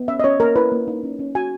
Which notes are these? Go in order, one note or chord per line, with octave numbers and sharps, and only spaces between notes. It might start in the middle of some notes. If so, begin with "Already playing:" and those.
Already playing: B3
C#4 E5
D#5
C#4 C#5
A#3 A#4
E4 B4
A#3
D#4
C#4
C#4
F#4 G#5